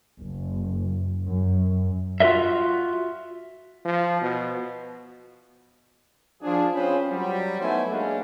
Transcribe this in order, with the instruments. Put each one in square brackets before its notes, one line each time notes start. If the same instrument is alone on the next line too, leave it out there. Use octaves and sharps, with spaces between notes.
[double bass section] F#1
F#2
[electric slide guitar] F4 F#4 A#4 D#5 E5
[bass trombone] F3
B2
[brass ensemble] F3 D4 G#4
C4 C#4 F4 G#4 B4 C5
F#3 G3
A3 B3 D#4 E4 C5 G#5
F#3 G#3 A#3 C#4 D4